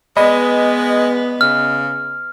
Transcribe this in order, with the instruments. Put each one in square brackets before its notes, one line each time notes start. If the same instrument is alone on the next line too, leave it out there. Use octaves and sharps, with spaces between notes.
[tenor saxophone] G#3 [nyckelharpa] B3 B4 [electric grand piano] D5 D#5 B5
[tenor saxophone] C#3 [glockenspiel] F6